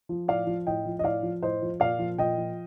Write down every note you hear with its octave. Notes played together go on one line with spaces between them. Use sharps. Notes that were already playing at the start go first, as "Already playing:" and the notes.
F3
A2 D5 F5
F3
A2 D#5 G5
F3
D#5
A2 D5 F5
F3
A2 C5 D#5
F3
A#2 D5 F5
F3
A#2 D#5 G5
F3